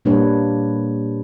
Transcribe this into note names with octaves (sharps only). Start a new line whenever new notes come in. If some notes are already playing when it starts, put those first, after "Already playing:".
A#2 G3 A#3 D4 B4 C#5